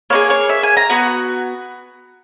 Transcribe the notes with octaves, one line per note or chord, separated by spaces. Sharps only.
A#3 D#4 G#4 C#5
C#5
E5
G#5
A#5
B3 F#4